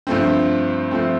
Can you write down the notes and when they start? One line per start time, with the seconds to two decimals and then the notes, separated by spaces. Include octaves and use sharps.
0.07 G2 F3 A3 C4
0.91 F3 A3 C4